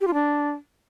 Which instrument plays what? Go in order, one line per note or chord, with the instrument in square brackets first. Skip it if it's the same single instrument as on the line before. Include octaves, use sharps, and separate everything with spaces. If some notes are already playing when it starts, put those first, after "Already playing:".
[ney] G4
F4
D4